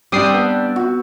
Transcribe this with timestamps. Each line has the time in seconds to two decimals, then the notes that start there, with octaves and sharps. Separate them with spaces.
0.12 G3 C4 D4 D6 D#6 C7
0.34 B3
0.76 F#4